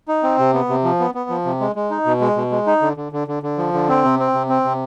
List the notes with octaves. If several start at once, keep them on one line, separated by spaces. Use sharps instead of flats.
D#4
C4
C3
B3
C3
F3
B3
B3
F3
C3
G#3
G#3
D#4
B2
G#3
B2
G#3
D#4
D3
D3
D3
D3
D3
F3
D3
C4
C3
C4
C3
C4
C3